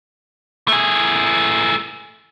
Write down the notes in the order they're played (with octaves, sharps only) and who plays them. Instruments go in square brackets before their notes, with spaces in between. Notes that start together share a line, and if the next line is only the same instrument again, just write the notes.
[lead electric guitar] A3 G#4